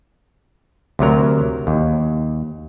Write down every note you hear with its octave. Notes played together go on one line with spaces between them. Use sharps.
D2 C3 F#3 A#4
D#2